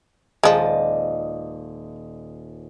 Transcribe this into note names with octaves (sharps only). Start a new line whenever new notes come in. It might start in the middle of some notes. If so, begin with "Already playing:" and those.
D#1 F3 G#3 D5 D#5